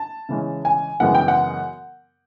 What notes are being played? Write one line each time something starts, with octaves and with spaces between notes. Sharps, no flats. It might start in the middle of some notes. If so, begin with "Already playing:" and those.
Already playing: A5
C#3 E3 G#3 C#4
G#5
F#2 C#3 E3 G#3 B3 F#5
G5
F#5